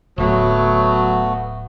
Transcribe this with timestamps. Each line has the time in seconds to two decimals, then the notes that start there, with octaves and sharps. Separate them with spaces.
0.18 D1 F#3 A3 B3 F#4